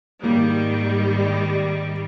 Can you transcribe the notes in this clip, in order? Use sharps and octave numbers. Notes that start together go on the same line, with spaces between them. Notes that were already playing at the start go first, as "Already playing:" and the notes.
G#2 D#3 G3 A#3